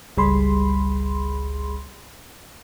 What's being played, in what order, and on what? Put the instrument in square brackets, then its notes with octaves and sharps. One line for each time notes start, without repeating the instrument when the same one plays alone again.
[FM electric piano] G1 C#2 G3 G#4 B5 C6